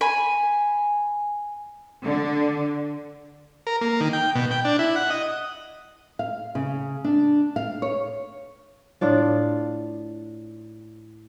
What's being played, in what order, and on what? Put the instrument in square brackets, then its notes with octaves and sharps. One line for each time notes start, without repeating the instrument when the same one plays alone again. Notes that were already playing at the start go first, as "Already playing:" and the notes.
[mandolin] G#5 B5
[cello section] D3
[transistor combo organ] A#4
A#3
D#3
G5
B2
G5
D4
E4
F#5
D#5
[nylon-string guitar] F5
C#3
D4
F5
C#5
[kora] A2 D4 F4